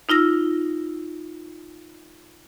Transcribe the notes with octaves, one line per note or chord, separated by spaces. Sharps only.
D#4 F4 E6 A#6